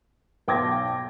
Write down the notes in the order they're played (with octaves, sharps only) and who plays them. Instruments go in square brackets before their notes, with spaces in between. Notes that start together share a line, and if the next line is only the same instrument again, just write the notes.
[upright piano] B1 G5 D6 G#6 A#6